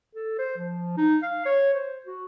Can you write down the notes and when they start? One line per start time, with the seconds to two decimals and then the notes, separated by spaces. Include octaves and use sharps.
0.15 A4
0.38 C5
0.57 F3
0.97 D#4
1.22 F5
1.46 C#5
1.74 C5
2.06 F#4